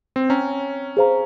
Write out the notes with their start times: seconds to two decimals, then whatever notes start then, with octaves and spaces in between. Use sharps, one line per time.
0.16 C4
0.29 C#4 C#5 G5 A#5
0.97 G#4 C5 F5 A#5